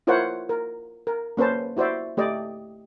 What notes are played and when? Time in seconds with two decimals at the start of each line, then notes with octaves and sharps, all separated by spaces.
0.07 E4 F4 A#4 C5 C#5 F#5
0.49 A#4
1.07 A#4
1.37 A#3 C#4 B4 C5 A5
1.77 E4 F#4 C5 D5 E5
2.17 A3 G4 D5 D#5